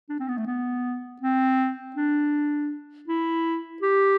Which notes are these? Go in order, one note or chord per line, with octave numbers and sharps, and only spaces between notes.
D4
C4
B3
A3
B3
C4
D4
E4
G4